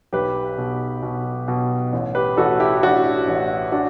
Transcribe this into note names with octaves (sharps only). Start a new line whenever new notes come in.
B1 G4 B4
B2
B2
B2
A1
G4 B4
A1 F#4 A4
E4 G4
A1 D4 F#4
A1
D4 F#4